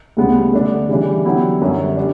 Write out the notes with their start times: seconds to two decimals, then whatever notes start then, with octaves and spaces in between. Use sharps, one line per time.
0.17 D2 C#3 G3 B3
0.53 D3 A3 D4
0.89 C#3 E3 G3 D4
1.25 D3 F#3 B3 E4 G4
1.62 F#2 D3 G3 C#4
1.97 G3 D4